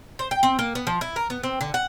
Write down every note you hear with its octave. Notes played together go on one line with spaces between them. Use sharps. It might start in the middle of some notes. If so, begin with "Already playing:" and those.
C5
G5
C4
A#3
B3
F3
E4
A#4
B3
C4
D3
F#5